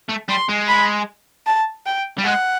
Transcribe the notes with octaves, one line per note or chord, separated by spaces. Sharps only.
A3
G3 C6
G#3
B5
A5
G5
G3
G#3 F#5